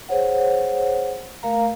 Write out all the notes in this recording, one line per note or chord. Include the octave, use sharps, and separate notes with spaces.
G#4 C5 C#5 F#5
A3 A#4 F5 A#5